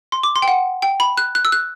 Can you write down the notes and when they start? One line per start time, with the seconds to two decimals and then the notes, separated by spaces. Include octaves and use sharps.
0.12 C6
0.23 D6
0.36 C6
0.42 G5
0.48 F#5
0.82 G5
1.00 B5
1.17 F#6
1.35 F#6
1.45 E6
1.52 F#6